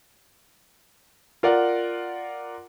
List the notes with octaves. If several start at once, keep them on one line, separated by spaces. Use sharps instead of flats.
F4 A#4 D5 F#5